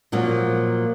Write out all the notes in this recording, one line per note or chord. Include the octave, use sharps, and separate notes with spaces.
A#2 F3 F#3 A#3